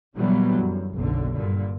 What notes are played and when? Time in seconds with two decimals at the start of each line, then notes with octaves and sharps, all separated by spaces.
0.16 A#2 D3 E3 F#3 G3 B3
0.59 F#2
0.95 F#1 B1 D3
1.33 G2 A#2 D3